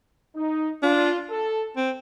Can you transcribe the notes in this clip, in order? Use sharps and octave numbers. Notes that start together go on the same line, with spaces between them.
D#4
D4 F4
A4
C4